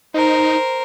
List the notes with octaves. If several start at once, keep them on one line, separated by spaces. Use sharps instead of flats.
D#4 A#4 C5